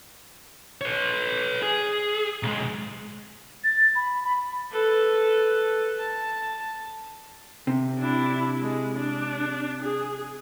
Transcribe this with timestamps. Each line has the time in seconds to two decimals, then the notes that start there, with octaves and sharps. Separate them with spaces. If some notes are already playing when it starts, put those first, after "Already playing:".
0.81 B4 C#5
1.62 G#4
2.43 B1 G#3
3.64 A6
3.95 B5
4.24 B5
4.72 A4 B4
5.99 A5
7.67 C3
7.99 D4 E4
8.61 G#3
8.98 D4
9.82 G#4